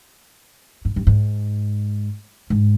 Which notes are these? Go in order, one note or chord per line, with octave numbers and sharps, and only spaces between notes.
G#2
G2
G#2
G#2